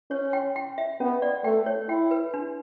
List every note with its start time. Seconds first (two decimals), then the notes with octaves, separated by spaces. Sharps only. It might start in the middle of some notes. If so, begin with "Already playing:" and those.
0.11 C#4 C#5
0.33 G5
0.56 G5
0.78 E5
1.00 B3 C#4
1.22 D5
1.44 A3 G5
1.66 C#5
1.89 E4 G5
2.11 B4
2.34 D4